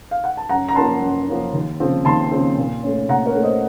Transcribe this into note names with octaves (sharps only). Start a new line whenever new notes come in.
F5
F#5
A5
F#2 F#5 A#5
A#5
F3 A#3 C#4 A5 C6
F#2
F3 A#3 C#4
D#2
C#3 F3 C4
D#2 A5 C6
C#3 F3 C4
A#2
A3 C#4
A#2 F#5 A#5
A#4 C#5
A3 C#4
C5 D#5